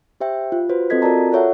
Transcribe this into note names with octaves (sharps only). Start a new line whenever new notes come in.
G4 C5 E5 G5
F4
F#4 B4 C5
C4 F4 A4 D#5 G#6 B6
F4 F#4 A#4 D5 A5 A#5
F4 A4 C#5 E5 F#5